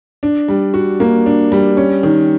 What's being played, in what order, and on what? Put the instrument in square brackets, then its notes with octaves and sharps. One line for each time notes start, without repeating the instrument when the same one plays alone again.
[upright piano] D4
G3
F#4
A#3
D4
G3
C#4
D#3